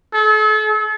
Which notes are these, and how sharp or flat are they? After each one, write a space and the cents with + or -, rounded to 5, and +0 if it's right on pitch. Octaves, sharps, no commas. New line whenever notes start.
A4 -40